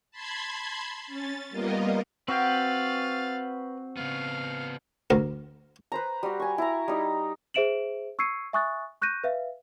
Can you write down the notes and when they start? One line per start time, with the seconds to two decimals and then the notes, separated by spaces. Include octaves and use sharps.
0.11 A5 B5 C6 G#6
1.07 C#4 A6
1.50 G3 A#3 B3 F4 A#4 D#5
2.28 C4 F#4 B4 F5 G5 A6
3.97 C#3 B3 F5
5.10 D2 A#4
5.92 B4 C5 A#5
6.23 G3 F#4
6.40 G#5 C#6
6.58 E4 A#5
6.88 G3 D#4
7.54 G#4 C5 E5 D7 E7 F#7
8.19 C#6 E6 G#6 C7 C#7 D#7
8.53 E5 G#5 C#6 D#6 F#6 A6
9.01 C#6 F#6 G6 A#6 D#7
9.24 B4 E5 F5